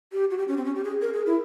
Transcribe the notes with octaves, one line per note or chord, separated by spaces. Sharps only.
G4
F#4
G4
C#4
C4
C#4
G4
G#4
A#4
G#4
E4